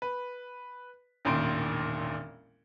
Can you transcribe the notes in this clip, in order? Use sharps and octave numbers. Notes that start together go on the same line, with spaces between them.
B4
E1 A1 A#2 D#3 C6 D7